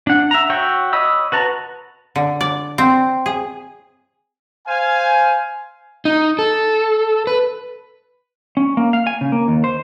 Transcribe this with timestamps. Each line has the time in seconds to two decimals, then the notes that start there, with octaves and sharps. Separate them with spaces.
0.07 D4 F#5
0.31 E5 A#5
0.50 F#4 C#5 E5 G5
0.93 C#5 D#5 B5 E6
1.32 F#4 B4 A5 A#5
2.16 D3
2.41 D5
2.78 C4
3.26 G#4
4.67 C5 F5 G#5
6.05 D#4
6.39 A4
7.27 B4
8.57 C#4
8.77 A#3
8.93 F5
9.07 G#5
9.21 C#3
9.32 A#3
9.48 D#2
9.64 C5